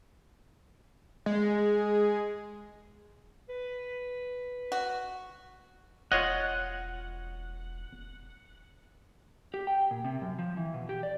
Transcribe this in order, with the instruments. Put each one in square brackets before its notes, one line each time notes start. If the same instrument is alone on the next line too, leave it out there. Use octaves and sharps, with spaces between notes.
[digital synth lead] G#3
[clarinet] B4
[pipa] F#4
[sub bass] E1 [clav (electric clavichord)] F4 C#5 D#5 [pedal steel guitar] F#5
[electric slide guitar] G4
G5
A#2
C3
F#2
F3
E3
B2
G4
D5